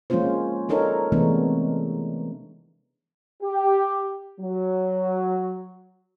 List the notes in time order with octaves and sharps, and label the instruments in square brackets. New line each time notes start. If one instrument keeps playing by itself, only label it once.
[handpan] F3 G#3 A#3 C#4 F4 C5
D4 D#4 A4 A#4 C#5
C3 E3 G#3 A3 B3 D4
[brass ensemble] G4
F#3